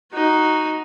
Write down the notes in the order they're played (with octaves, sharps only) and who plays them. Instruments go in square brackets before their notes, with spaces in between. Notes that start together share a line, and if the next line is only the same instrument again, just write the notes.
[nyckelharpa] D#4 F#4